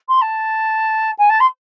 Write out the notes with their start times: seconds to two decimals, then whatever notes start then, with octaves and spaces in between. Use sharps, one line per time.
0.09 C6
0.22 A5
1.18 G#5
1.30 A5
1.40 C6